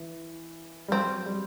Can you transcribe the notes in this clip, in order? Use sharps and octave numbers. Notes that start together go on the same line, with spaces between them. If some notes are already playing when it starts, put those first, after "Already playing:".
Already playing: E3
G3
F#3 C4
G3